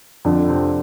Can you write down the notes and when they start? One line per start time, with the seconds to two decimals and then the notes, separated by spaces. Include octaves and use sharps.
0.25 F2 D3 D4
0.49 C3 C4